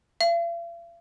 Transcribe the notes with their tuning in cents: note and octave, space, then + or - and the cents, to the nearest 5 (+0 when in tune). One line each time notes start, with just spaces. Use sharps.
F5 -45